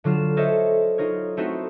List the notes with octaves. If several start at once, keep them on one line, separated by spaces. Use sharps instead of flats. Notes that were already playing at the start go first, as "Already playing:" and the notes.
D3 F#3 F4 F6 E7
A4 A#4 C5 C#5 D#5 E5
D#4 F4 A#4 C#5
A3 B3 C4 D#4 E4 F#4